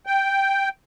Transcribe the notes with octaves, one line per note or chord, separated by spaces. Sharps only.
G5